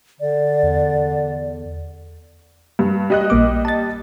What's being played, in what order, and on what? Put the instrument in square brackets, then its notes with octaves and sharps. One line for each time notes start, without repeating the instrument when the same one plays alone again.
[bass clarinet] D3 [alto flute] D5
[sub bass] E2
[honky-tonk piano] G2
G3 D#5 F#6
[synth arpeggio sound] A#1 A#3 D6
A5 A6